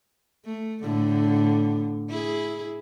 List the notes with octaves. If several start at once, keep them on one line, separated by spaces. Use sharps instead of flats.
A3
A2 D3
E4 G#4